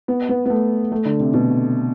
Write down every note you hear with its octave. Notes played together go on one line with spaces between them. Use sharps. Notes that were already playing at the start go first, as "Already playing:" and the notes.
B3
B3
B3
A3
A3
D3
C3
B2